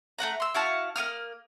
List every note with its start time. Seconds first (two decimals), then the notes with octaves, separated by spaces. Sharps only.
0.18 A3 C4 F#5 A#5
0.40 C6 E6
0.54 E4 F#4 F5 A5
0.96 A#3 E4 D#6 F6